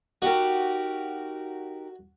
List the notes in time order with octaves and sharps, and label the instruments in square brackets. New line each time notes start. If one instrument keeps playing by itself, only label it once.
[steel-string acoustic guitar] D#4 G4 A#4 [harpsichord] F#4